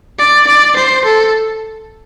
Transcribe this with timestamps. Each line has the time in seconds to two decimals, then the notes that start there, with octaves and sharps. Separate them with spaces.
0.19 D5
0.47 D5
0.76 C5
1.04 A4